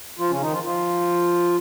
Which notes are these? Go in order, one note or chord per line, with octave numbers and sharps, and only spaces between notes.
F3 F4
C#3 C#4
D#3 D#4
F3 F4
F3 F4